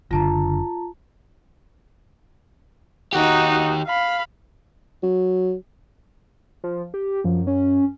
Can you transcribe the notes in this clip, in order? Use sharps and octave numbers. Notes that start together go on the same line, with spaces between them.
F#1 D3 F4 A5 A#5
D#3 D#4 F#4 G4
F5 B5
F#3
F3
G4
F#2 F3
C#4